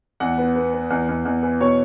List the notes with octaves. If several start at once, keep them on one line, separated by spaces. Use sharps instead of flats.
E2 F#5
B3
B3
B3
E2
E2
E2
E3
B2 C#5